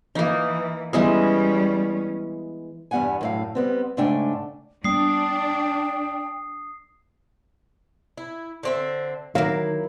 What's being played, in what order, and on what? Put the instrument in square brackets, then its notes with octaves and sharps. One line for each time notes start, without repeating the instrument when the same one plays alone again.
[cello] E3 [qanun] A#3 D#4
[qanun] E3 G#3 B3 [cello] G3 C#4
[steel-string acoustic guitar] E2 G2 G3 B3 F#5 G#5
F#2 A2 F5
G3 B3 C4
G#2 C#3 A3 D4 G5 G#5
[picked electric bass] G3 A#3 B3 [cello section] D4 [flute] G5 [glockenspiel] D#6 C7
[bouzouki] E4
D3 C4 E5
[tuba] D#3 [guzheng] F#3 A#3 [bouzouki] E4 [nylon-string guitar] F5